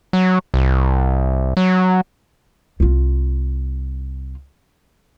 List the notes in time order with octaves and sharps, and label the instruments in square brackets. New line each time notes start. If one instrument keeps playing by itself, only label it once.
[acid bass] F#3
C2
F#3
[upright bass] C2 F4